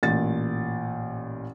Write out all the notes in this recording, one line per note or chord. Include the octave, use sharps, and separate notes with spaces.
A1 A#2 A6